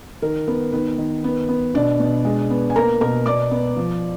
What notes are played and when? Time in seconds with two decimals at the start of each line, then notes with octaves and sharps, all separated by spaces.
0.22 D#3 A#4
0.47 B3 A#4
0.72 D#3 B3 B4
0.98 D#3
1.24 B3
1.49 B3
1.74 B2 D4 D5
2.00 B2
2.25 G#3
2.50 B3
2.70 G#5
2.76 A#3 A#4 A#5
3.01 B2 A#4 A#5
3.26 B2 D5 D6
3.51 B3
3.77 F3